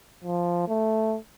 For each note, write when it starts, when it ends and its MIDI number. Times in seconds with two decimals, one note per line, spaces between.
0.25 0.68 53
0.68 1.16 57